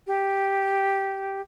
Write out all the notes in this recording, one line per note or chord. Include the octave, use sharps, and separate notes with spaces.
G4